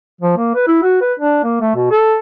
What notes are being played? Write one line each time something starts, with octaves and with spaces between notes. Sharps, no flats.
F3
A#3
B4
E4
F#4
B4
D4
A#3
A3
B2
A4